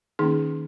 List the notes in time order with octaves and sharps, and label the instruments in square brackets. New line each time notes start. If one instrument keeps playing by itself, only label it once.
[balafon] D#3 A#3 C#4 D#4 G#4